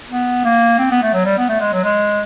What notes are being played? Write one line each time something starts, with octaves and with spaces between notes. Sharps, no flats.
B3
A#3
C4
B3
A3
F#3
G3
B3
A3
G#3
F#3
G#3